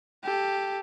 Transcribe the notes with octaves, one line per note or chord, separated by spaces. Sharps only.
G4 A4